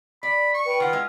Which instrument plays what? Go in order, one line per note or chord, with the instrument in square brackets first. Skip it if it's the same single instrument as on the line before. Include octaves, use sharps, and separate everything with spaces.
[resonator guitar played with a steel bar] D5 [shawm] B5
[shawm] C#6
[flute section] B4 G5
[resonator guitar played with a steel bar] D#3 F#5 [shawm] F4
[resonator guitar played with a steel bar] G#3 E4 D#5